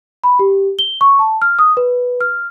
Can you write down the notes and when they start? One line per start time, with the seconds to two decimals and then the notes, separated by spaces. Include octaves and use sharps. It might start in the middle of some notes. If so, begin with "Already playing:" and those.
0.24 B5
0.39 G4
0.79 G7
1.01 C#6
1.19 A5
1.42 F6
1.59 D#6
1.77 B4
2.21 F6